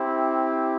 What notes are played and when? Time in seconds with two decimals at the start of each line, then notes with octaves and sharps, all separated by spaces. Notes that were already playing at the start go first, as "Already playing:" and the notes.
Already playing: C4 E4 G4